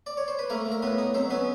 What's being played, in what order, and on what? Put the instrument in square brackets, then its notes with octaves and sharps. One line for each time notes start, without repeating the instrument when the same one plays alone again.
[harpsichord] D5
C#5
C5
B4
A3 A#3 A#4
A3
A#4
A2 B3 B4
D#4
F#3 C4 C5
B3 C#4 B4